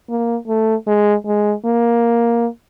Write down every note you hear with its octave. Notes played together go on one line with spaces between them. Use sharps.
A#3
A3
G#3
G#3
A#3